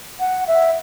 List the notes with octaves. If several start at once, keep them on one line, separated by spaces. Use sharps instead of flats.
F#5
E5